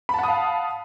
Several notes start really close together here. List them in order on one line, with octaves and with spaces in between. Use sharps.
B5 A5 F#5 D#6 F5